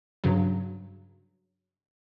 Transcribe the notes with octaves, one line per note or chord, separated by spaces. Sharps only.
G2 C#3 F#3